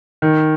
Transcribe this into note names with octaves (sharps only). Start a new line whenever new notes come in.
D#3